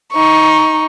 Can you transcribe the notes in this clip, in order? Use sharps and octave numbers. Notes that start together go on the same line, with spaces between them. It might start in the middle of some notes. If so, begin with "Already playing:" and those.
D#4 C#6